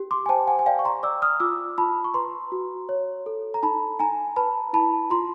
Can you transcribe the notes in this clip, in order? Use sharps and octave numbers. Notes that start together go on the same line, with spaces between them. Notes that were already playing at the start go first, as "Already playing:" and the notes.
Already playing: G4
C6 D6
G#5
C5 G5 A5
F#5 G#5
G#5
D5 F5 G5
C#6
A#5 C6
D5 D6 E6
D#6 F6
F4 D6 E6
F4 A5 B5
C#6
B4 A#5 C6
F#4
C#5
A4
A#5
D#4 A5 B5
D#4 G#5 A#5
B4 A5 B5
E4 A5 B5
F4 A#5 C6